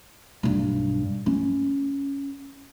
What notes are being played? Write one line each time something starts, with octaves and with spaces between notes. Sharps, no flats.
B1 G2
C#4